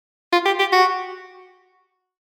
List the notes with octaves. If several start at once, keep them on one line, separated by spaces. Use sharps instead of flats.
F4
G4
G4
F#4